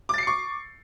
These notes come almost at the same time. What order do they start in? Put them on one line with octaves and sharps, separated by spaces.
D6 A6 C7 C#7 C#6